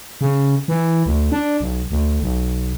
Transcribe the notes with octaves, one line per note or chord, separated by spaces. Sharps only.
C#3
E3
D2
D4
B1
D2
B1